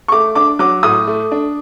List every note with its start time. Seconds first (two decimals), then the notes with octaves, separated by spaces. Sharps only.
0.08 C#6
0.12 A3 D6
0.35 D4 D6
0.59 F#3 D6
0.83 A2 D#6
1.07 A3
1.32 D4